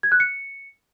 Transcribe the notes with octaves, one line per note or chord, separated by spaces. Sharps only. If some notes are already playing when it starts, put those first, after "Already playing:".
G#6
F#6
C#7